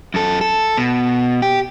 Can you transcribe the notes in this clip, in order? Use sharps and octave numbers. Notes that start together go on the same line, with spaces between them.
F#2 A4
A4
B2
G4